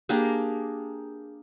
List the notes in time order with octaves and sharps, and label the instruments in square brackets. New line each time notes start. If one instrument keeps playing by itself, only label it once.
[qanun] A#3 D4 G4 G#4